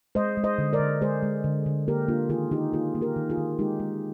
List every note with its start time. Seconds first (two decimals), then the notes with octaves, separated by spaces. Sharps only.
0.15 G#3 C5 D#5
0.37 G#3
0.44 C5 D#5
0.58 D3
0.73 A#4 D5
0.80 D3
1.01 G#3 G#4 C5
1.23 G#3
1.44 D3
1.66 D3
1.88 A#3 G4 A#4
2.08 A#3 D4 F4
2.30 D#3 F4 G#4
2.51 D#3 D#4 G4
2.73 A#3 F4 G#4
2.95 A#3
3.01 G4 A#4
3.16 D#3
3.30 F4 G#4
3.38 D#3
3.59 G#3 D#4 G4
3.80 G#3